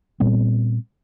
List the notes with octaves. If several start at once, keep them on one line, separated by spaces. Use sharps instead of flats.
A#2 G3 B3 C4